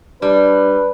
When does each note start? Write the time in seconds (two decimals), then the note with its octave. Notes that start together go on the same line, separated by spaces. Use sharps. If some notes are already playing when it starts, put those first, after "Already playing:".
0.22 G3 D4 B4